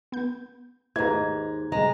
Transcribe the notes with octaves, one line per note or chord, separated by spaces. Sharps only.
B3 G6
D#2 G#2 A3 E4 B4 A#5 G#6
C3 G3 G#3 A#5